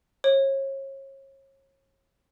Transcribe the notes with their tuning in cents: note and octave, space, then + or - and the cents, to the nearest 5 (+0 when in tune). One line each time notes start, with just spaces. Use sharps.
C#5 -35